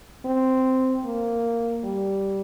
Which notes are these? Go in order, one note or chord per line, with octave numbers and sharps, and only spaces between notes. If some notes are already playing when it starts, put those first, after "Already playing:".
C4
A#3
G3